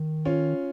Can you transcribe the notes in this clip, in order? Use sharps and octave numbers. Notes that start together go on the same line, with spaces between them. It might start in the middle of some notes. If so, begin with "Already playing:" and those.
Already playing: D#3
C#4 F4